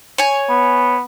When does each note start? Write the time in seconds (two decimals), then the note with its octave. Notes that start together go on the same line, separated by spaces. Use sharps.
0.18 C#5 G#5
0.49 B3